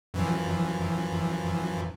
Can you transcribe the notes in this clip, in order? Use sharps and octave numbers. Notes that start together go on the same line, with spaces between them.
F#2 E3 F3